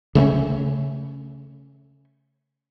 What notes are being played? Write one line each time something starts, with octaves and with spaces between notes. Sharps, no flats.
C#3 A3 A#3 C#4